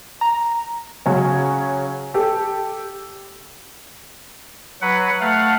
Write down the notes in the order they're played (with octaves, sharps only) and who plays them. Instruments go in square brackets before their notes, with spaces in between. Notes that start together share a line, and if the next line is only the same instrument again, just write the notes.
[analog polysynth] A#5
[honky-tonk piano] C#3 F#3 C#4
G4 A4
[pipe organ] F#3 B4 F#5
A3 F5 F#5